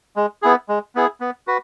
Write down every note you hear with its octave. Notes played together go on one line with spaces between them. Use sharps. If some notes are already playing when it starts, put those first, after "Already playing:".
G#3
B3 E4 G#4
G#3
B3 E4 G#4
B3
F#4 B4